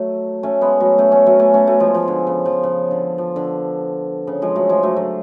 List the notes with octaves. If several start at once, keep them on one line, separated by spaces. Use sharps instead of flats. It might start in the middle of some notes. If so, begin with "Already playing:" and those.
Already playing: F#3 A3
A3 C#4
G#3 B3
F#3 A3
A3 C#4
A3 C#4
F#3 A3
A3 C#4
A3 C#4
F#3 A3
F3 G#3
F3
D3
C#3
F3
C#3
D3
F3
D3
C#3
F3 G#3
F#3 A3
F3 G#3
F#3 A3
D3 F#3